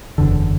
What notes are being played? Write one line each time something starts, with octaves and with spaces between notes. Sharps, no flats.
F#1 E2 D3